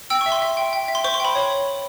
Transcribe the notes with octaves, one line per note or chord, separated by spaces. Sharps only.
G5 E6
C#6
E5
C6
E5
G5
G5
E5
C6
C5 C#6
C6
G5 B5
C#5